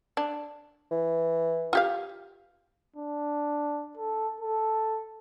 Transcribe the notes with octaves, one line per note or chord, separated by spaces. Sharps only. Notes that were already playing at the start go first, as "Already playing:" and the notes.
D4
E3
F4 G4 F5
D4
A4
A4